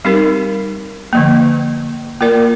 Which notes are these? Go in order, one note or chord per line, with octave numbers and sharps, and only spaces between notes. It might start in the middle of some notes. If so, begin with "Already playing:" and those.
G3 C4 D#4 G4 A#4
D3 F3 A#3
A#3 F4 A#4 D5